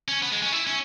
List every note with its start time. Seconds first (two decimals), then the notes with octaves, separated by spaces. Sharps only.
0.08 C#4
0.22 B3
0.32 G#3
0.42 C#4
0.52 E4
0.67 C#4